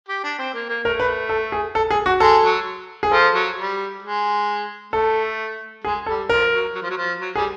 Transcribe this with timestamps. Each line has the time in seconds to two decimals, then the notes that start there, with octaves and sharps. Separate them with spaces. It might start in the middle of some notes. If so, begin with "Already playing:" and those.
0.09 G4
0.24 D4
0.39 C4
0.54 A#3
0.69 A#3
0.84 A3 A#4
1.00 B4
1.29 A4
1.52 G#4
1.75 A4
1.90 G#4
2.06 F#4
2.20 G#3 A4
2.43 F#3
3.03 G#4
3.12 F3 A4
3.34 F#3
3.57 G3
4.02 G#3
4.93 A3 A4
5.84 G#3 G#4
6.06 G3 A4
6.29 F3 A#4
6.52 F#3
6.75 F#3
6.83 F3
6.90 F#3
6.98 F3
7.21 F#3
7.35 G3 G#4